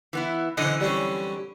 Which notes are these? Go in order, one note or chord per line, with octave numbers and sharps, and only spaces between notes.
E3 B3 E4
F#2 D3 E3 C5 D#5
G3 C4 C#4